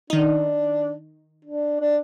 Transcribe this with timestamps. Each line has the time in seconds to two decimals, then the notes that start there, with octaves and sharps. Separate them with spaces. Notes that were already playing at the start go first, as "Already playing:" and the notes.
0.10 D#3 D4 D#4
1.45 D4
1.80 D4